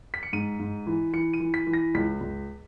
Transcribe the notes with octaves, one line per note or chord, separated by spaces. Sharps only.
B6
C#7
G#2 D#7
G#2
E3
E3 C#7
D#7
E3
B6
E3
A#6
C#2 B6
C#2